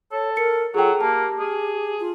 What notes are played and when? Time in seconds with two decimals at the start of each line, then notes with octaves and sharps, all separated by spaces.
0.12 A4 C#5
0.37 A#4 C#7
0.75 F#3 F4 G#4 A4 G5
1.01 A#3 G4 A5
1.39 G#4
2.00 F4